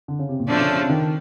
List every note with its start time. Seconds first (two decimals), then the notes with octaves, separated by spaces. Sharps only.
0.08 D3
0.19 C#3
0.29 C3
0.40 A#2
0.49 B2 D3 F3 A3 D4
0.60 C#3
0.70 C#3
0.80 C3
0.90 D#3